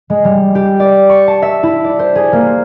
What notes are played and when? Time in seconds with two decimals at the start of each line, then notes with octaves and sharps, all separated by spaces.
0.10 G#3
0.25 G3
0.55 G4
0.80 D5
1.09 C#6
1.27 A5
1.42 E5
1.63 E4
1.84 D5
1.99 C5
2.15 G#4
2.33 A#3